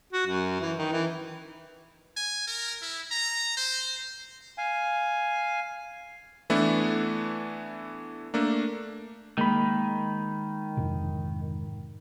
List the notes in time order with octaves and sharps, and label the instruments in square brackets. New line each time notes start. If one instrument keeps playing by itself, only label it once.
[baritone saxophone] F#4
F#2
E3
D#3
E3
[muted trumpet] G#5
A#4
E4
A#5
C5
[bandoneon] F5 G#5
[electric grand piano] E3 A3 B3 D4 E4
A3 A#3 D4
[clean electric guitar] D#3 [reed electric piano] G#3 B5 [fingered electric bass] A#3
[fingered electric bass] F2 G#2 C3